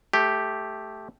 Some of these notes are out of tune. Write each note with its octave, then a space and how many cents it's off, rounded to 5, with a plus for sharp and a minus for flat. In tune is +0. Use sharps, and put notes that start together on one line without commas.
A3 -10 G4 +0